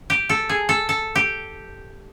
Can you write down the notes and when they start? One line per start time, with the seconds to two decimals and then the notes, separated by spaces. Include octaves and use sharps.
0.10 G4
0.29 A4
0.49 G#4
0.69 A4
0.89 A4
1.15 G4